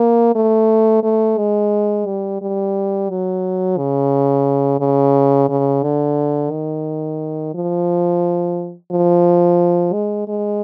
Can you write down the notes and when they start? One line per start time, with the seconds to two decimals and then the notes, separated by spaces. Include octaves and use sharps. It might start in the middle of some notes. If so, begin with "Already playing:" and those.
Already playing: A#3
0.35 A3
1.03 A3
1.38 G#3
2.06 G3
2.41 G3
3.10 F#3
3.78 C#3
4.80 C#3
5.49 C#3
5.83 D3
6.51 D#3
7.54 F3
8.92 F3
9.93 G#3
10.28 G#3